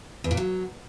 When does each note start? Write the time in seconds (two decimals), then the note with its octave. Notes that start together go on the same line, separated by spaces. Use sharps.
0.24 E2
0.31 A#2
0.37 F#3